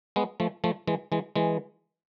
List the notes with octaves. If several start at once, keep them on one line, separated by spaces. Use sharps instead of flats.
G#3 B3
F3 A3
F3 A3
E3 G#3
E3 G#3
E3 G#3